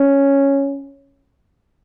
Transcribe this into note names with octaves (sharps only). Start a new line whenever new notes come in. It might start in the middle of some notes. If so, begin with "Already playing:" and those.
Already playing: C#4